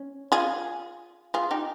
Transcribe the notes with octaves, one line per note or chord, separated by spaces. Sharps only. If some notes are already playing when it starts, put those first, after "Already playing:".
Already playing: C#4
F4 G#4
F4 G#4
D#4 G4